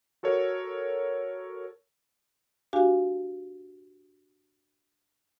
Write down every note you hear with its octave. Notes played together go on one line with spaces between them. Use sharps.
F#4 A4 A#4 C#5
D4 F#4 G4 F5 G#5